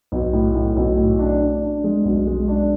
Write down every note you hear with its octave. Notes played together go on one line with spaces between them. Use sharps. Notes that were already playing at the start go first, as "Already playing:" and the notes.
B1
A2
A2
B1
A2
D4
D4
D4
G#3
B1
G#3
D4